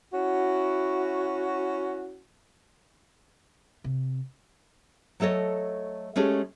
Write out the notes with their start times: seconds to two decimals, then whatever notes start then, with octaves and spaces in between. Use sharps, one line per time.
0.13 C#4 E4 F#4
3.84 C3
5.20 F#3 A3 A4 C#5 D#5
6.16 G#3 A3 C#4 G4 G#4